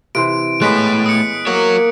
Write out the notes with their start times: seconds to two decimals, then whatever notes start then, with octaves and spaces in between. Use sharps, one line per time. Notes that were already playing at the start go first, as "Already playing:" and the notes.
0.15 C3 E3 C5 D7
0.62 G#3 A3 B3 C#5 F#6 B6
1.06 D#6 C#7
1.47 A#3 F#4 C#5